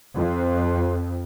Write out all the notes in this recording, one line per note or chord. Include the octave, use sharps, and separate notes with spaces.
F2